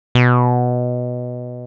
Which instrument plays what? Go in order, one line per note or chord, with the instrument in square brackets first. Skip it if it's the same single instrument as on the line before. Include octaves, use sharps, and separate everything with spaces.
[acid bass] B2